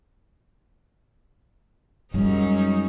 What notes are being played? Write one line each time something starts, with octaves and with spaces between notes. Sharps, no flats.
F#2 G3 G#3 C#4 D#4